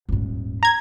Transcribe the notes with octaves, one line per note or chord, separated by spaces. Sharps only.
D#1 G#2
A#5 G#6